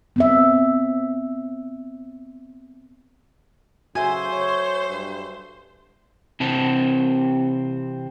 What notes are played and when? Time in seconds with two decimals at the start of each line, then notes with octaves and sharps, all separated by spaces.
0.16 B3 C4 E5
3.95 C#3 F#4 A4 C5 E5 G#5
4.32 C#5
4.89 G2
6.40 C3 E3 C4 A5